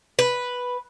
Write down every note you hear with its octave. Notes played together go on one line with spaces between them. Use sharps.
B4